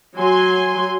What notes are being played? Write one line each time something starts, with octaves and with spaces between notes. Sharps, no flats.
F#3 G#5 C6